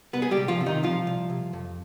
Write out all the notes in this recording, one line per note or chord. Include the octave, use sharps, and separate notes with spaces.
C2 B3 B4
G#4
G3 G4
C2
F3 F4
C3
D#3 D#4
C2 F3 F4
C2
C2
F2